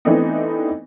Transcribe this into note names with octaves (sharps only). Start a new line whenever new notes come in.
E3 A3 B3 C4 D4 D#4